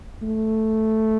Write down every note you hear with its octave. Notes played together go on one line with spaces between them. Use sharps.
A3